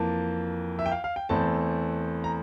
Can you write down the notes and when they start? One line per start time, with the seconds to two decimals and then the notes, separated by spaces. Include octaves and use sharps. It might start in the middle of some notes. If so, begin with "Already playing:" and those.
Already playing: F2 E3 A#3 A5
0.79 E5
0.86 G5
0.92 F5
1.04 F5
1.16 G5
1.29 E2 E3 A3 C4 A5
2.24 A#5